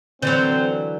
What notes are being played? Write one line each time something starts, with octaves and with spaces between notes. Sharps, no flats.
D3 E3 F#3 C4 C5